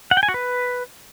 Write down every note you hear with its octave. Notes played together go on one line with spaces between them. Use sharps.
F#5
G5
G#5
F#4
B4